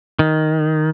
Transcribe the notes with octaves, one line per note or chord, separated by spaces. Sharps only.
D#3